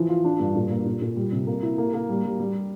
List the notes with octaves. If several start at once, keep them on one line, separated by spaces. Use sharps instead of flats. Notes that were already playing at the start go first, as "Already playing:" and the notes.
Already playing: E3 F3
F4
D4
G2
A#2
A#3
A#2
A#2
G3
C3
A#3
E4
A#3
A#3
G3
G3
G3